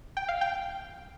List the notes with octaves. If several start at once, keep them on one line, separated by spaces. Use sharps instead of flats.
G5
F5
G5